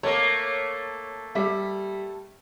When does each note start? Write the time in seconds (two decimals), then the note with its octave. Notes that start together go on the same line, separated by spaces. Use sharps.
0.03 A3 A#3 C#5
1.35 G3 G4 E5